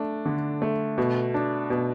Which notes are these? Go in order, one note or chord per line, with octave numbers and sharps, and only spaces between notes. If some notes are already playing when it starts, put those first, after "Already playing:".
Already playing: A3 D4
D3
A3
B2
D4
B2